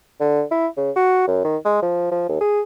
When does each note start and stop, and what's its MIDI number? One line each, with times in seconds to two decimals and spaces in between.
0.20 0.43 50
0.51 0.67 64
0.77 0.91 49
0.96 1.27 66
1.27 1.41 42
1.44 1.57 51
1.65 1.82 56
1.82 2.10 53
2.11 2.27 53
2.29 2.37 39
2.41 2.61 68